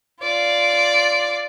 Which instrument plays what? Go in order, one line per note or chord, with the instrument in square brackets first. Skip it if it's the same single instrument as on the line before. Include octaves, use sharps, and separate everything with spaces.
[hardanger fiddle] F4 D5